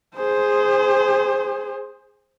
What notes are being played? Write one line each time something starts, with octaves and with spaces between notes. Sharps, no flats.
G#4 C5